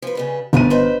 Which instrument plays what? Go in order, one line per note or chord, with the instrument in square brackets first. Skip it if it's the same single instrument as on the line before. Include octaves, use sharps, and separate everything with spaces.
[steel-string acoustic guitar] F3 B4
C#3 G3 B4
[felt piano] G1 D#7 [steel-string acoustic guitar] C3 A3 G4
[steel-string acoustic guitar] D#4 B4 C5